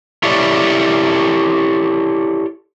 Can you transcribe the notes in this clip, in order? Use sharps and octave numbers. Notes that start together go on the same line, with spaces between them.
E4 G4 A4 C#5 D5 E5